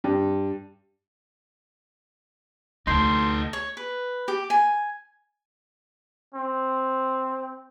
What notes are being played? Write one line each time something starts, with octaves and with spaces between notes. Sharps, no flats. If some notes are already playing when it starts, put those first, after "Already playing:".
G2
D2 D#4 A4 C6 G6 C7
C#5
B4
G4
G#5
C4